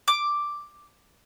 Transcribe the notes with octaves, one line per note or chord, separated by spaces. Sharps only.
D6